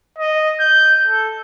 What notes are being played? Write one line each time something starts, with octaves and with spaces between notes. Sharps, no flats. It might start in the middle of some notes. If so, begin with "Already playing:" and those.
D#5
G6
A4